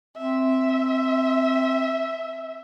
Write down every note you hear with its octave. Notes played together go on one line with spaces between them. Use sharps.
C4 E5